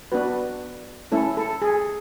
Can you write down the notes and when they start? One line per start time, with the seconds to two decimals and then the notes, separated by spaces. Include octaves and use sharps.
0.12 B3 D4 F#4 B4
1.12 A3 C#4 E4 A4
1.37 A4
1.62 G#4